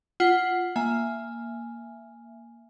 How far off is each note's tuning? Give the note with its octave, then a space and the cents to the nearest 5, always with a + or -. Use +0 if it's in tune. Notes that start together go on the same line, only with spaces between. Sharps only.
F4 +0 F#5 +0
A#3 +0 E5 +20 G#5 +0